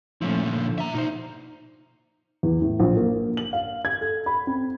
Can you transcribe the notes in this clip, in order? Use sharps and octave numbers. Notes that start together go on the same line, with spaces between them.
A#2 F3 A3 C#4 E4
D3 F3
E5 A#5
B2 D#4 C5 E5
E2
A2
A#1
A#3
F#7
F5
G#6
A4
B5
C4